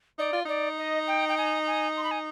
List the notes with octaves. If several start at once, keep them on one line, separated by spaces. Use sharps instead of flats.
D#4 D5
F4
D#4 D5
D#5
G5
G5
G#5
G#5
C6
B5
G#5